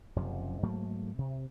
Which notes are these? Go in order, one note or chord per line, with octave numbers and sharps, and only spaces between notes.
F#1 F#2 C3 F3
G#2 F#3 A3 A#3
C3